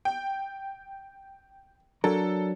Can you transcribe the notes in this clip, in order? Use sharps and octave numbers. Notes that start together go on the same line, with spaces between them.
G5
F#3 D4 A4 A#4